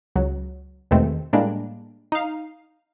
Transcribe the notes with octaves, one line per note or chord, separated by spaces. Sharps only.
C#2 F#3
E2 B2 D#3 G#3 A3 C4
A2 G3 G#3 A#3 D4
D#4 F5